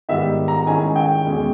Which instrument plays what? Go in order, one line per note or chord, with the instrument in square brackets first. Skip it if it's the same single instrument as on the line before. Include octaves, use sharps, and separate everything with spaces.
[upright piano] G#2 D#3 G3 B3 E5
A#5
D#3 G#3 C#4 E4 G#5
G5
E2 B2 G#3 C#4